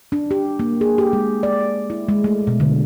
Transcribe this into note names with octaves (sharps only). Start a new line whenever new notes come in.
D4
G4
A#3
G#4
G4
G#3
D5
E4
G#3
A3
B2
D3